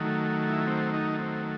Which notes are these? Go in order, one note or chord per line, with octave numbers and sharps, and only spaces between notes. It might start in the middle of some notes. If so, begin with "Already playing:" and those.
Already playing: D#3 F#3 A3
E4
C4
D#4
C4